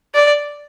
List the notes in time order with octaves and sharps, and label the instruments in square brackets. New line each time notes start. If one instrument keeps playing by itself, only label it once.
[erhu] D5